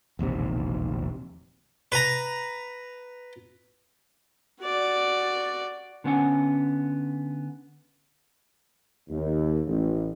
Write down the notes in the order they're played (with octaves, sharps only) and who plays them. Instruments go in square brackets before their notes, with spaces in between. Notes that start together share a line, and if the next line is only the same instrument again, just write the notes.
[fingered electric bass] E1 A#1 D#2 C3
[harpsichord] B4 A#5
[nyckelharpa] F#4 D5
[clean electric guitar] D3 B3 C#4 F#5
[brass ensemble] D#2
A1